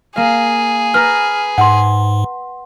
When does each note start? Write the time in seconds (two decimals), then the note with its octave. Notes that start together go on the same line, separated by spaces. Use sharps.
0.16 A#3 G#4 F5
0.94 B4 A#5 F6
1.58 G#2 F#5 C6